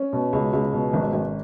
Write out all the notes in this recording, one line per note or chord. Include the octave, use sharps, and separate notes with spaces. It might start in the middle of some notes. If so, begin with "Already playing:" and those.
Already playing: C#4
B2
C#2
C#2
B2
G#1
G#1